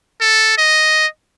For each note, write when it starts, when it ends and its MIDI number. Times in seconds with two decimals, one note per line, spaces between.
0.21 0.56 69
0.58 1.07 75